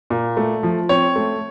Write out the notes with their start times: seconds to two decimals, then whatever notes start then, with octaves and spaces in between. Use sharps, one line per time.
0.10 A#2
0.37 A3
0.63 F3
0.89 C4 C#5
1.16 A3